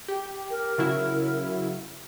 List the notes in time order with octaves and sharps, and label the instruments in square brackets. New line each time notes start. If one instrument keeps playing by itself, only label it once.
[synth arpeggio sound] G4
[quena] A#4
[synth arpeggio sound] C#3 F#3 E4